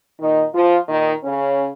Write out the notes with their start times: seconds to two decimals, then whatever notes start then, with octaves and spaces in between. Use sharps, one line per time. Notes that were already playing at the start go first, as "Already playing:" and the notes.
0.20 A#2 D#3 D#4
0.54 F3 F4
0.88 A#2 D#3 D#4
1.22 C#3 C#4